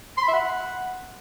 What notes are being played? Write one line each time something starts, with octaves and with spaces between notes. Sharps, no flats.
C6
B5
E5
F#5